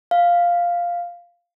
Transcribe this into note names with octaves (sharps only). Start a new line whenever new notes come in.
F5